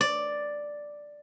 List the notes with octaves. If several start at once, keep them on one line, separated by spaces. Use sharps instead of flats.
D5